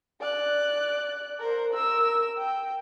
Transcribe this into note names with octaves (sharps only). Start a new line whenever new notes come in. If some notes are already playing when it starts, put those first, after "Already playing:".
D5 F#6
A#4 C5
A#4 E6
G5